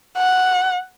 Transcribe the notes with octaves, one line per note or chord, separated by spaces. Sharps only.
F#5